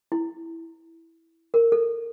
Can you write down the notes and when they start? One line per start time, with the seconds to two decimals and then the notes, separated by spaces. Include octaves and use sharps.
0.12 E4
1.54 A#4
1.72 A4